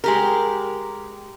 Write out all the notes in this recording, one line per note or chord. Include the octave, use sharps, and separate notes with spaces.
G#3 G4 A#4